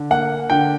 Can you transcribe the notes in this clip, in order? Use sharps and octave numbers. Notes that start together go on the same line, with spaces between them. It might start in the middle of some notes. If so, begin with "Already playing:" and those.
Already playing: D3
A#3 F#5
D3 G5